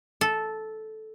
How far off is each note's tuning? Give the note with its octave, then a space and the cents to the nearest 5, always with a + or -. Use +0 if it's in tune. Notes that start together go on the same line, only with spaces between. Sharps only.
A4 -10